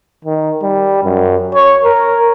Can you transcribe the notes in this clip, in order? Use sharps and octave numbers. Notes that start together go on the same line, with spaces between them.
D#3
G3
F#2
C#5
A#4